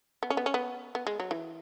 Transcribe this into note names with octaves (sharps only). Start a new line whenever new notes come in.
B3
C#4
B3
C#4
B3
B3
G#3
F#3
E3